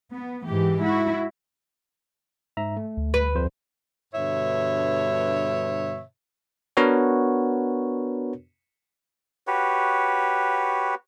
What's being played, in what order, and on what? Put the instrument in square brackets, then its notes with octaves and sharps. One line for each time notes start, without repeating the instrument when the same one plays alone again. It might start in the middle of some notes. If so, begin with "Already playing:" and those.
[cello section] B3
G#2 E3 G4
E4 F#4
[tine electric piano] G#2 E5 A#5
A3
[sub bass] D2
[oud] B4
[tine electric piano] F2 C5
[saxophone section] G2 B2 D3 C#5 E5
[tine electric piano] B3 D4 F#4 A#4 B4 C#5
[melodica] F#4 G4 B4 C#5